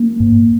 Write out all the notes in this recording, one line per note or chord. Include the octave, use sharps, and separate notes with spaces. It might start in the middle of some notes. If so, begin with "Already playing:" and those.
Already playing: A#3
G#2